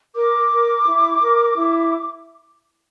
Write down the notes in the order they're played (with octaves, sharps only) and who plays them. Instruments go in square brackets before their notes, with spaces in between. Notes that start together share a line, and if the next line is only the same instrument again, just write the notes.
[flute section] A#4 D6
A#4
E4
A#4
E4